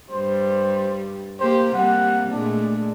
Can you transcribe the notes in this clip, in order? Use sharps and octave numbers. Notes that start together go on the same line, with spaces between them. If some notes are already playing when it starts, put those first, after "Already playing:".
G2 G3 C5
A#3 G4 C5
C3 G3 A#3 F#5
A#2 G#3 A3 D4